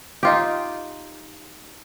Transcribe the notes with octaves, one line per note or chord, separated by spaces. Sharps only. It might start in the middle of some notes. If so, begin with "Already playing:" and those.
D#4 F4 G4